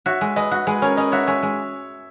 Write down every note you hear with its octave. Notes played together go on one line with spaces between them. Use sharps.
F#4 C#5 E5
G#3
G#3 B4 D#5
F#4
G#3 G#4 B4
C#4 A#4 C#5
C#4 B4 D#5
F#4 C#5 E5
G#3 C#5 E5
G#3